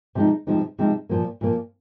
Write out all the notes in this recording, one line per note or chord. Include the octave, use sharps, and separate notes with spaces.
C3 F3 G#3 D#4
C3 F3 G#3 D#4
C3 F3 G#3 D#4
A#2 F3 A#3
A#2 F3 A#3